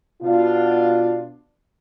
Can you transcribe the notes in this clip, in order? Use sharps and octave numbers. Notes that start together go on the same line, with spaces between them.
B2 D4 F4